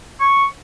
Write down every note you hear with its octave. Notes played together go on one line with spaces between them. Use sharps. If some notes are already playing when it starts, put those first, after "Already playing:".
C#6